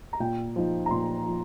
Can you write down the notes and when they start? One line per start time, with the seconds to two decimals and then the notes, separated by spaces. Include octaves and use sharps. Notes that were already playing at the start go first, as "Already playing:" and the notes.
0.13 A#5
0.20 A#2 G5
0.56 F3 D#4
0.86 A#5
0.90 A#2 C6
1.26 F3